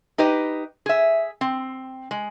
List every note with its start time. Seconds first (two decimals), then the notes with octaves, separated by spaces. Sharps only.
0.18 D#4 G4 B4 D#5
0.86 G#4 E5
1.41 C4
2.11 G#3